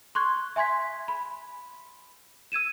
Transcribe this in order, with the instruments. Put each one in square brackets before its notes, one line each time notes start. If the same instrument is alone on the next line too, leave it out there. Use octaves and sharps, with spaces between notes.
[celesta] C6 C#6 F#6 G#6
E5 G#5 C6 G#6 B6
B5
E6 G#6 D#7 E7